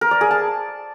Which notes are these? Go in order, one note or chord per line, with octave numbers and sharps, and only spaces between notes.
A#4
D5
G#4
A5